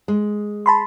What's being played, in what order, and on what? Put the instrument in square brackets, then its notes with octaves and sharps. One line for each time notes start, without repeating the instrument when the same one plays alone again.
[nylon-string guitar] G#3
[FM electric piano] A5 B5 C6